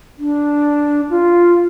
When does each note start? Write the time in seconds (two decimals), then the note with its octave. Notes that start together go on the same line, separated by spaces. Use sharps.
0.19 D4
1.10 F4